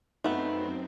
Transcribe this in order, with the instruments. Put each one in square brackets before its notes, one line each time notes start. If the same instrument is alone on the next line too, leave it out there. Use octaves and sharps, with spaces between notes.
[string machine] F#2 C4 [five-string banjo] A3 B3 [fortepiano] D#4